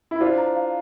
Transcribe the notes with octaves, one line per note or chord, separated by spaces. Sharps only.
E4
D4 F4 C5
A#5
F5